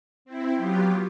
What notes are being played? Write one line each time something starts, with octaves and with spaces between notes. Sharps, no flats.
C4 E4
F#3 B3 F4 G4